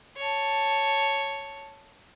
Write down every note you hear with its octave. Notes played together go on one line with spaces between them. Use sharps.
C#5 A5